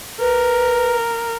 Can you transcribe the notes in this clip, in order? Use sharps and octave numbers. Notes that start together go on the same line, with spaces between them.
A#4 B4